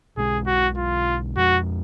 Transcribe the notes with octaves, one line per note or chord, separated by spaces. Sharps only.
B1 B2 G#3 G#4
F#4
F4
F2 F3 G#3 F#4